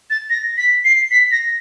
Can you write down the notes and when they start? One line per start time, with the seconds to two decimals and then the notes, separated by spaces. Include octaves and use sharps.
0.10 A6
0.30 A#6
0.58 B6
0.85 C7
1.11 B6
1.32 A#6